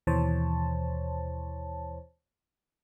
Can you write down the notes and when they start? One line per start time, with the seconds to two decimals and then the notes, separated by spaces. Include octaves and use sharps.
0.07 D#2 B2 E3 C5 C#5 A5